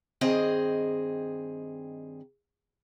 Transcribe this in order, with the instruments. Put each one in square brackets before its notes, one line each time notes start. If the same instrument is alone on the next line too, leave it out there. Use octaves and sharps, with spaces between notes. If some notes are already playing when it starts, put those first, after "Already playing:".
[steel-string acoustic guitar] G2 D#3 C4 G#4 D#5